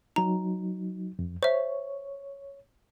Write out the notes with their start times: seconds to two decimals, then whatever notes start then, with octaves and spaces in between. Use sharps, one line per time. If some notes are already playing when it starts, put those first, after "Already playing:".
0.16 F#3 D#4 A#5
1.19 F2
1.43 C5 C#5 E5